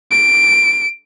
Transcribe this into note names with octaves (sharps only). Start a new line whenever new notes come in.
D7